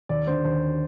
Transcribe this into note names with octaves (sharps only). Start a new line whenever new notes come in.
D#2 D5
D3 C5
D#2 C5